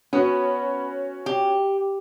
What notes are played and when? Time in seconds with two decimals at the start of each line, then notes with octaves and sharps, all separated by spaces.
0.13 B3 C#4 F#4
1.26 G4